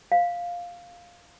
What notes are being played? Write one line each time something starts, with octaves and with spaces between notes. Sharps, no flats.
F5